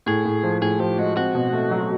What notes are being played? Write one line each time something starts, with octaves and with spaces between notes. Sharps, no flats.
A2 G#4
A2
F3
A2 G#4
F3 G4
G#3 F#4
C4 F#4
B2
A3
F#3